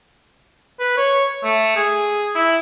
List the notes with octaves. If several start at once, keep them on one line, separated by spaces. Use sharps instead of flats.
B4
C#5
A3
G#4
E4